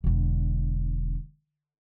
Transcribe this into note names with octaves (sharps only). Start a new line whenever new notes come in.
E1 D3